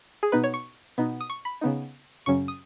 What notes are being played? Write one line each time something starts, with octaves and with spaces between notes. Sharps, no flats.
G#4
B2 B3 D#4 B4
C#5
C#6
B2 B3 D#4
D#6
C#6
B5
C#3 B3 D#4
F#2 C#3 F#3 C#4 C#6
D#6